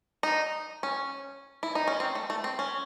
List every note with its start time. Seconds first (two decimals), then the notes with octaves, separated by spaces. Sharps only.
0.23 D#4
0.83 C#4
1.63 E4
1.75 D#4
1.88 C#4
2.00 C4
2.15 A3
2.30 A3
2.44 C4
2.59 C#4